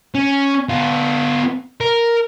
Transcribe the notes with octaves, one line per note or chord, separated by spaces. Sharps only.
C#4
B3 F4
A#4